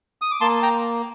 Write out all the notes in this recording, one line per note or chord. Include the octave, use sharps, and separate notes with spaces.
D#6
D6
A#3 A5 C6
G5 A#5